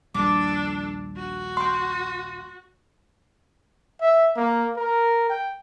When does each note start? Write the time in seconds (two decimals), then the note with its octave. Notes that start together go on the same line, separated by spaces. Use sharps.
0.14 A#1 D#2 G3 D4 A4 D6
1.16 F#4
1.57 F5 G5 C6
4.01 E5
4.37 A#3
4.76 A#4
5.30 G5